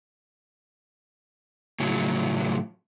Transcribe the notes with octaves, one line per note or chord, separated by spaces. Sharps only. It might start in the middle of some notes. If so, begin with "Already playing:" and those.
A2 C#3 F3 F#3